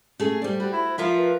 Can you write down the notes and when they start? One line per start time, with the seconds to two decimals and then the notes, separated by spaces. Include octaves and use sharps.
0.20 A3 C#4 G#4
0.42 G3 C5 D5
0.60 G3 F#4
0.73 E4
0.98 F3 F4 A#4 E5
1.15 B4